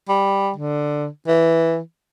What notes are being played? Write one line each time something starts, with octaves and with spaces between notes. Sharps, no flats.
G3
D3
E3